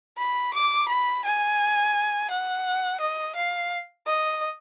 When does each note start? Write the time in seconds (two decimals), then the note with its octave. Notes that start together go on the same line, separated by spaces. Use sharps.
0.18 B5
0.54 D6
0.88 B5
1.25 G#5
2.31 F#5
3.01 D#5
3.36 F5
4.07 D#5